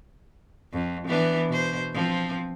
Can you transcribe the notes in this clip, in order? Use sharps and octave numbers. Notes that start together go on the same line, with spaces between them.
F2
E3 B3 D4
B2 C5
F3 C4